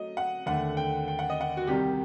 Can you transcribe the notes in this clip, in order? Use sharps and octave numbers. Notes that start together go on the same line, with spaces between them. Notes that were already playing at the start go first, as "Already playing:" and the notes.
Already playing: F#3 A3 D#5
F#5
D#2 D3 A3 F#5
G5
G5
F#5
D#5
F#5
F#4
C2 C3 D#3 G3 G4